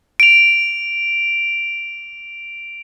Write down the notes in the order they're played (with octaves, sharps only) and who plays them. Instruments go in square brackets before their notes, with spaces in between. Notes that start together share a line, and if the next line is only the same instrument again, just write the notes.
[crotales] D7 F7